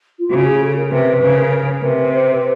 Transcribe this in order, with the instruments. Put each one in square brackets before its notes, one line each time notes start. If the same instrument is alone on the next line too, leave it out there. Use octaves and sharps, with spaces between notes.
[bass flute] F4
[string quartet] C#3 [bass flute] F#4
[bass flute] G#4
A4
A#4
[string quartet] C3 [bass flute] B4
[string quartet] C#3 [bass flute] B4
[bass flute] A#4
[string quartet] C3 [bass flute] B4
[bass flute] B4
C5
B4